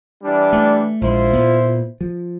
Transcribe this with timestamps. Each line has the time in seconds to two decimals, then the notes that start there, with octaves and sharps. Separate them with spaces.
0.23 E3 G3 D4
0.53 A3
1.01 A#1 G#3 E4 F4 C5
1.33 A#2 B3
2.01 F3